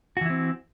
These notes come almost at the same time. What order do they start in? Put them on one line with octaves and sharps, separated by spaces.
F#4 E3 E4 C4